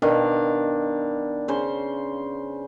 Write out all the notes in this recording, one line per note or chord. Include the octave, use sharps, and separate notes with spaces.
B2 D#3 D4 F5
C#3 C5